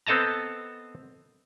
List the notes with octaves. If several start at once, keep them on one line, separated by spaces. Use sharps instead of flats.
B3 C4 A4 D#5 A5 A#5